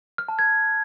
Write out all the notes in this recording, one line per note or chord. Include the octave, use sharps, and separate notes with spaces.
F6
A5
G#6